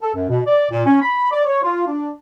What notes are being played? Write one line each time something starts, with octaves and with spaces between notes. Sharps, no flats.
A4
F#2
B2
D5
A#2
C#4
B5
D5
C#5
F4
D4